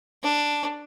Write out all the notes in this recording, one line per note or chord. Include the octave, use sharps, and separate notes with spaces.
D4